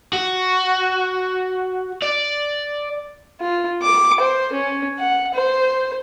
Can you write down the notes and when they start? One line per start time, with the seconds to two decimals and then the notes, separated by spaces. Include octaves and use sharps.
0.13 F#4
2.02 D5
3.41 F4
3.82 D6
4.20 C5
4.53 C#4
4.99 F#5
5.34 C5